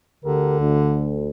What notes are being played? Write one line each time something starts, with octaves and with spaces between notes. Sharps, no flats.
D2 D3 G4 A#4
D2